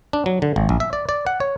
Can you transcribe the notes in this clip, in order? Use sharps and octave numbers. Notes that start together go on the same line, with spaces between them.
D4
F#3
D3
G#1
A#1
E5
D5
D5
F#5
C#5